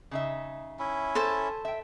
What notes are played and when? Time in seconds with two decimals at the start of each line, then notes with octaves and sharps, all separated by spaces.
0.11 C#3 D#4 E5
0.79 C#4 E4
1.15 A4 C5 A5
1.65 E5 G5